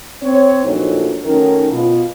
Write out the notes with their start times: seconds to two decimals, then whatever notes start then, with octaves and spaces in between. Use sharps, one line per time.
0.22 C4 C#5
0.64 A#2 F3 F#3 A3 D4 D#4
1.25 D#3 F#3 A3 C#4 D#4 A#4
1.71 B2 F4